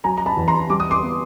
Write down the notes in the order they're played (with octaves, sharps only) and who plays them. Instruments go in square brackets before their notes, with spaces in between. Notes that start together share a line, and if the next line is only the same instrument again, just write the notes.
[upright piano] F#3 G#5 A#5
A#5
A5 B5
E2
A#5 C6
G3 D6
D#6
C6 D6
B3